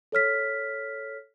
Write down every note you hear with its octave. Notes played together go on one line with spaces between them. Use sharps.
A4 C#5 F6 B6